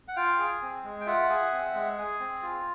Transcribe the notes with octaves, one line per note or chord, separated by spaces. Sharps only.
F#5
F4 F5 G5
G#4
C4
G#3
G5
F4 E5 F#5
G#4
C4
G#3
G#4
C4
F4